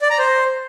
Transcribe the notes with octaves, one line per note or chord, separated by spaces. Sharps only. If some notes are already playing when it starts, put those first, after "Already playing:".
D5
A#5
C5